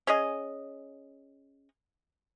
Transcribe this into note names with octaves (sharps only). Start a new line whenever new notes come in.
C#4 G#4 D#5